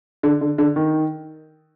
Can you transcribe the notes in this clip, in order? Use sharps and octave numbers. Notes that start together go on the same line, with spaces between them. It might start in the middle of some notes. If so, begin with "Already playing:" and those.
D3
D3
D3
D#3